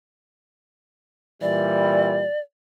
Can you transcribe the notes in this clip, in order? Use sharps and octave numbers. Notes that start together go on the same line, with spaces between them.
A#2 E3 G3 D5